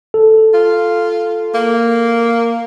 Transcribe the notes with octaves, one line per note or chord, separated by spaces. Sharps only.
A4
F4
A#3